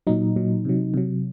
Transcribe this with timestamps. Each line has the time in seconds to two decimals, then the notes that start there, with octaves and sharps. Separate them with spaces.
0.07 A#2 F#3 D#4
0.36 A#2 F#3
0.65 C3 F#3
0.94 C3 F#3